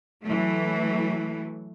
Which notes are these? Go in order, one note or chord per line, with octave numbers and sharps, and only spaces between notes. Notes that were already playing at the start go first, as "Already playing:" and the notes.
E3 F#3 A3